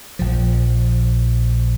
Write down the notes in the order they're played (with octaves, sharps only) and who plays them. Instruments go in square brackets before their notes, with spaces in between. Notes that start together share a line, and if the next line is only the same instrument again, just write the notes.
[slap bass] A#1 F3